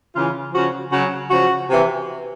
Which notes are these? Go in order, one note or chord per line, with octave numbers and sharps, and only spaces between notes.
C#3 E3 F4
C#3 F3 F#4
C#3 F#3 F#4
C#3 F3 F#4
C3 E3